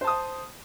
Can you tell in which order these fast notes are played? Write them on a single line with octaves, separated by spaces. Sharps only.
C5 A5 D#6